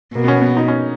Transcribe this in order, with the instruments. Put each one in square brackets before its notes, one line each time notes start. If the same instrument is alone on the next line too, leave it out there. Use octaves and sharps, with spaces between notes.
[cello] B2 [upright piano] A#3
[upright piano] B3
C#4
B3
D#4
C#4